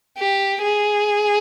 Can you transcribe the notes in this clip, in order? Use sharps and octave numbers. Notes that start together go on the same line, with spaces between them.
G4
G#4